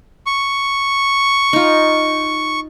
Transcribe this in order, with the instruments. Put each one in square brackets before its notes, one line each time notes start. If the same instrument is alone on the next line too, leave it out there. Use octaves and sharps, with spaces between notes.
[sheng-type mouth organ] C#6
[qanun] D#4 F4